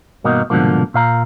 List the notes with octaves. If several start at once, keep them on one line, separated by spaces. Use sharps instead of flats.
G2 B2 D#3 A#3 D#4 F#4
C2 G#2 B2 D3 F3 A#3
A#2 F5 A#5